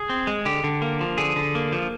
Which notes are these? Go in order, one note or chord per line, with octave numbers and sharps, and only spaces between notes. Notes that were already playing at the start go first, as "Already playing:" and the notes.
Already playing: G#4
C4
G#3
D3 G4
D3
A#3
F3
D3 G#4
D3
A#3
F3